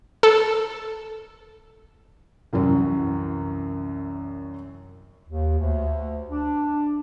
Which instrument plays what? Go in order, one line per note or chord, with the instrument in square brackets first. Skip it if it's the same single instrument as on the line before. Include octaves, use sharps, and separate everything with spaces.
[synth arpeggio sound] A4
[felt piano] C2 F#2 E3 F#3
[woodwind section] D#2
D2
D4